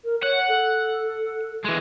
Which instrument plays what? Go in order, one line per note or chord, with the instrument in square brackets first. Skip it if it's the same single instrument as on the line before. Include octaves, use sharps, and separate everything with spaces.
[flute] A#4
[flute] C#5 [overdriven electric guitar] F#5
[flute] A4
[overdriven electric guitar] E3 G#3